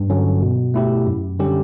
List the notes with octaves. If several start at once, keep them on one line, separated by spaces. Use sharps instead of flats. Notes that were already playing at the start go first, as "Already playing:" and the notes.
Already playing: G2
D3 F#3 C#4
B2
A3 E4 G4
F#2
D3 G3 C#4 G4